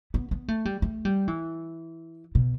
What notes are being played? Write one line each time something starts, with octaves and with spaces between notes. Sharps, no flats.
B3
B3
A3
G3
A3
G3
E3
B2